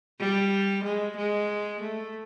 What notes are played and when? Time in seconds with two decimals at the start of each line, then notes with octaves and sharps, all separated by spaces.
0.19 G3
0.84 G#3
1.17 G#3
1.82 A3